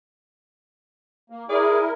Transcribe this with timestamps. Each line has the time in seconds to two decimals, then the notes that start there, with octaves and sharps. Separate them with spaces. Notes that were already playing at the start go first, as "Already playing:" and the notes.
1.30 A#3
1.49 E4 G#4 A#4 D5